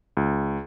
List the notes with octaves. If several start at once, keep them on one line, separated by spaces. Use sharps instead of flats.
C#2